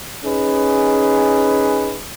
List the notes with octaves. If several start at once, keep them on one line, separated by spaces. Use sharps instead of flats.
C#4 D#4 G#4 B4